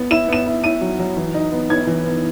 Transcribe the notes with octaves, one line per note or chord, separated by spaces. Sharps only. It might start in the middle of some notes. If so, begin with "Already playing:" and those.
Already playing: B3
E4 E7
B3 E7
E4
E4 D#7
F#3
F#3
E3
D#4
B3
B3 G#6
E3
B3